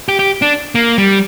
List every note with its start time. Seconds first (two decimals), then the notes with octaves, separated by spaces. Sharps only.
0.09 G4
0.19 G4
0.42 D4
0.75 A#3
0.98 G3